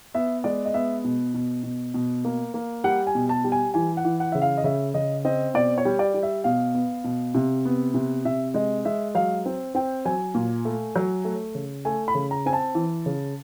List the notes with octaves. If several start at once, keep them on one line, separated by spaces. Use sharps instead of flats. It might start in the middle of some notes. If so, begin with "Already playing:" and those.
B3 E5
G#3 D5
D#5
B3 E5
B2
B2
B2
B2
A#3
A#3
G3 F#5
G#5
B2
A5
G3
G#5
E3 G#5
F#5
E3
F#5
C#3 E5
F5
D#5
C#3 E5
C#3 D#5
C4 D#5
B2 D5
C#5
G3
D5
G3
E5
B2 F5
B3
B2
C3
B3
C3
C3 E5
G#3 D#5
G#3 E5
F#3 F5
C4
C4 G5
F#3 G#5
A#2
A3
F#3
A3
C#3
A3 G#5
B5
C#3
A#5
C4 G#5
A5
E3
C#3